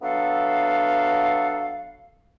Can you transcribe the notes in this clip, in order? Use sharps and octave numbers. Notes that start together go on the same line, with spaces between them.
F#3 B3 D4 A4 E5 F5